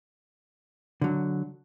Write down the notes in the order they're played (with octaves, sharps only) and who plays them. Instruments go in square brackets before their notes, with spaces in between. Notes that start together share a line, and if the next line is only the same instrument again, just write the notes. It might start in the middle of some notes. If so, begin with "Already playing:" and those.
[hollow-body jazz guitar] D3 F#3